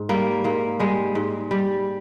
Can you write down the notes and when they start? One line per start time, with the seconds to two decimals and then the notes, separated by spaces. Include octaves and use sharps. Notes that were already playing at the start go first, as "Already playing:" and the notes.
Already playing: G#2
0.09 G3 A#3
0.44 G#2 A#3
0.80 G3 G#3
1.15 G#2
1.51 G3